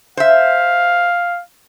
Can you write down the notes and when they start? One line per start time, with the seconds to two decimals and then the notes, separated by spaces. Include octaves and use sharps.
0.17 C5 E5 F5